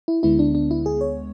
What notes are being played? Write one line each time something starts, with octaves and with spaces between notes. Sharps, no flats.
E4
D2 D3 G#3 B3 E4
D4
D4
E4
G#4
C#5